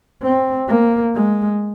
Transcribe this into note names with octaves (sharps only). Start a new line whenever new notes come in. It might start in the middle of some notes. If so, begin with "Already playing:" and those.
C4
A#3
G#3